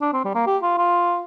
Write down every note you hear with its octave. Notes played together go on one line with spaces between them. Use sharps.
D4
C4
G3
A#3
G4
F4
F4